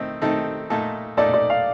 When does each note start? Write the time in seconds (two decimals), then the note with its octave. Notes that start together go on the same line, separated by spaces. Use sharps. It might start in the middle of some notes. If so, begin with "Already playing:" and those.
Already playing: D#3 A3 C4 D#4 A4
0.22 D#3 A3 C4 D#4 A4
0.70 A#2 A3 D#4 A4
1.17 A#2 A3 D#4 A4 D5
1.34 D5
1.50 F5